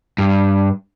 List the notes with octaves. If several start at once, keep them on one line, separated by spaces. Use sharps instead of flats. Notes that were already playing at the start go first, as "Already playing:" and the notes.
G2